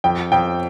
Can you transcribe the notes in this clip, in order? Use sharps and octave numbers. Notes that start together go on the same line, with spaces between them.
F2 G5
F2 G5